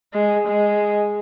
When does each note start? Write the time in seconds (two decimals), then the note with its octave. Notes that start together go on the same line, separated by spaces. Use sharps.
0.14 G#3
0.47 G#3